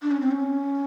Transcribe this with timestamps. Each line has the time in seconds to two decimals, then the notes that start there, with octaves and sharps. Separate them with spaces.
0.02 D4
0.11 C#4
0.20 C4
0.31 C#4